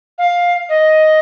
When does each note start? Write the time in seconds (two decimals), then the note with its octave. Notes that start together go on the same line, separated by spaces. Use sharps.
0.18 F5
0.69 D#5